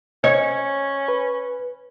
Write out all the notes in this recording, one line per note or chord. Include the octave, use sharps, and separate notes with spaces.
C#4 C#5 D#5
B4